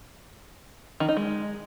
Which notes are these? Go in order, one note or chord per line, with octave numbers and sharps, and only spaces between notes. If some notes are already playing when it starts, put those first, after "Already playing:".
D#3
D#4
G#3